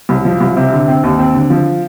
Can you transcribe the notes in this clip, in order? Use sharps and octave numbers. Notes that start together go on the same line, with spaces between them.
C2
F3
C2
C3
D3
C4
D#2
C4
D3
F3